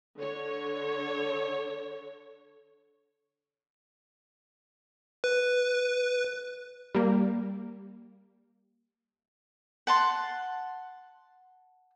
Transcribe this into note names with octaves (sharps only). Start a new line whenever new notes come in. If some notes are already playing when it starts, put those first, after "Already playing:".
D3 C#5
B4
G3 A#3
F#5 A5 C6